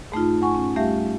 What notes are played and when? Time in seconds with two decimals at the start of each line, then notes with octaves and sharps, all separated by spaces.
0.12 G#2 A3 D#4 F4
0.42 F#5 G#5 C#6
0.55 C#4
0.76 G3 A3 G4 E5 F5